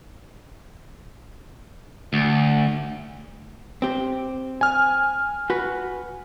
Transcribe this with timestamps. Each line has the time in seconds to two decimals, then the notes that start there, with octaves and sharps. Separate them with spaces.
2.13 D2
3.82 C4 G4
4.61 G#5 F6
5.50 F#4 B4